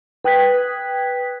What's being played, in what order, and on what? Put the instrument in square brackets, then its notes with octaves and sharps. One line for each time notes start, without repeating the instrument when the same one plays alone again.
[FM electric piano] B4 G5 D#6 F#6 G#6 B6